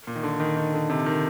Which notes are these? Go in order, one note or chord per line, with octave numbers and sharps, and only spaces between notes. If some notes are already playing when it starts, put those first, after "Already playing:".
A#2
D#3
D3
D#3
D#3
D3
C3
D#3